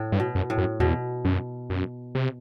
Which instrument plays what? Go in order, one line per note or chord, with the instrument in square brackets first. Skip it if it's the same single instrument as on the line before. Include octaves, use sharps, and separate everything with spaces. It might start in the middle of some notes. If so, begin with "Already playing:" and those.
Already playing: [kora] A2
[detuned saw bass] G2
[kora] B2
[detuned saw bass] F#2
[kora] A2
[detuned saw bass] F#2
[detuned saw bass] E2 [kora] B2
[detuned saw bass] F#2
F#2
C3